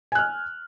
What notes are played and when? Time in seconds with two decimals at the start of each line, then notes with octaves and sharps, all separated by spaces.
0.12 G#5
0.15 F#6
0.19 F6